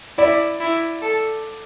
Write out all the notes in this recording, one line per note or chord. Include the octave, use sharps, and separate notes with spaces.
E4 D5
E4
A4